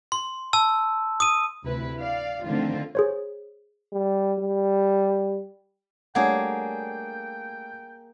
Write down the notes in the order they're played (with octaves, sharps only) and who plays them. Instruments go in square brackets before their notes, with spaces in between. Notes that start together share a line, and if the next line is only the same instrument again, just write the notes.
[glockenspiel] C6
A5 E6
D#6 D#7
[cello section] D2 C3 E4 B4
D5 F5
D3 D#3 F3 A3 C4 F4
[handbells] G#4 C5 C#5
[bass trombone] G3
G3
[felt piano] G3 A3 D4 [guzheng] A#3 G#4 [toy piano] C#5 F#5 [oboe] G5